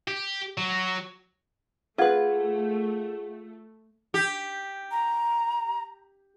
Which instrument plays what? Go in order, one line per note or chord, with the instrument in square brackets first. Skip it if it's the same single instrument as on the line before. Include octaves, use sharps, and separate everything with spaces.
[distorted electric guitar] G4
F#3
[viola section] A3 [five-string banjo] F4 B4 [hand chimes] G#4 [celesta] F5 F#5 G#6
[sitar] G4
[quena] A#5